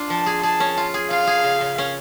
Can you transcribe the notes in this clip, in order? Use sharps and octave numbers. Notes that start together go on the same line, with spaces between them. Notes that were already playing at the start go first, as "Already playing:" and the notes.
Already playing: D4 F4
F3 A5
G#4
G#4 A5
C#4
F4
G#4
F4 F5
G#4
C#3
C#3
C#4